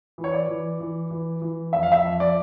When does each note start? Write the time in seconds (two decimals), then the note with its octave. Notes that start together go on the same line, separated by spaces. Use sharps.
0.18 E3
0.24 C#5
0.33 D5
0.48 E3
0.80 E3
1.11 E3
1.42 E3
1.73 F2 E5
1.83 F5
1.92 E5
2.04 F2
2.20 D5